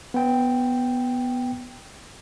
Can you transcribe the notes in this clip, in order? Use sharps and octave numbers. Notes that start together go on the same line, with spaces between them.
B3 G5